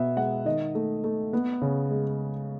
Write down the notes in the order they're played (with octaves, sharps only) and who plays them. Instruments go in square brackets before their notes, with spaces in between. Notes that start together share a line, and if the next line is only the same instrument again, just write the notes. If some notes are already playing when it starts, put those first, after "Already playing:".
Already playing: [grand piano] B2 B3 E5
G#3 F#5
D#3 D#5
A3
A3
B3
C#3
G#3